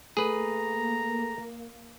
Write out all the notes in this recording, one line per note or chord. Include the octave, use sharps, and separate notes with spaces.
A3 A#3 G#4 B4 A#5